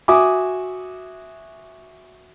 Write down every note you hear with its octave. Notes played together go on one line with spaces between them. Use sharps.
F#4 E5 G#5 D6 D#6